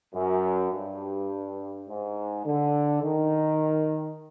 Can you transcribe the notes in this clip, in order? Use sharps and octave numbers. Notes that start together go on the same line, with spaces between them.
F#2
G2
G#2
D3
D#3